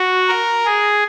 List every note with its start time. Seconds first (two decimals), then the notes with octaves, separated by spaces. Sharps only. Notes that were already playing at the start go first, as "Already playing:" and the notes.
Already playing: F#4
0.28 A#4
0.65 G#4